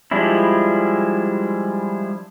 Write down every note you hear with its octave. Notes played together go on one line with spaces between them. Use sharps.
F3 G3 G#3 D4 E4